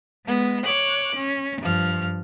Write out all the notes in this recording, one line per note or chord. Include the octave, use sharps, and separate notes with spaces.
G#3 B3
C#5 D6 F#6
C#4
G2 F3 F6